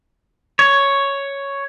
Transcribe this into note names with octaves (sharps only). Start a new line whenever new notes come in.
C#5